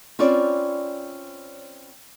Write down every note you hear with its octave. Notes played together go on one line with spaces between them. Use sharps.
C4 C#4 E4 F4 C#5 D5